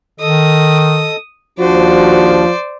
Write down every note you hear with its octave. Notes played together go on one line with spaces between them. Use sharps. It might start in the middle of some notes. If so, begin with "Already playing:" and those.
D#3 A4 D#5 D#6
D#2 F3 D4 F#4 C5 D5